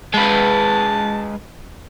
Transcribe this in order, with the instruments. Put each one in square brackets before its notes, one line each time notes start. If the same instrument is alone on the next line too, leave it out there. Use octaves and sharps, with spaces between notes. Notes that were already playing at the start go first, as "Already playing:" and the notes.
[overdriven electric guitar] G#3 B4 [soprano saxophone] A5